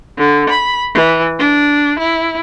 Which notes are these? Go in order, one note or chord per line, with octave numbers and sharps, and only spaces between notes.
D3
B5
E3
D4
E4